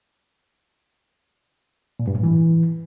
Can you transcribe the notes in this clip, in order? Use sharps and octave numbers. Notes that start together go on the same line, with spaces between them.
A#2
G2
A2
E3